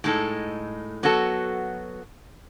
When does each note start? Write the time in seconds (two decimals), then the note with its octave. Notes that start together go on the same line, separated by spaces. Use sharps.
0.04 A2 G#3 D#4 A4
1.03 F#3 B3 F#4 A4